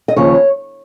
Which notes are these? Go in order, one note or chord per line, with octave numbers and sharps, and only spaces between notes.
D#5
D#2 C#3 F3 C#5